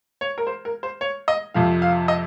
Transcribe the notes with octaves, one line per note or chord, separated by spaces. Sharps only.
C#5
A#4
C5
A#4
C5
C#5
D#5
F2 C3 F3 F5
F5
D#5